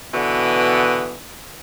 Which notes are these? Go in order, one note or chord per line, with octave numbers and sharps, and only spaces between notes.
B2 D3 E3 B3